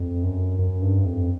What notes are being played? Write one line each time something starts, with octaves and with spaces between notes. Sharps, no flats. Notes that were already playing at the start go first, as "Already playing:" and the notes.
Already playing: F2
F#2
F#2
G2
F2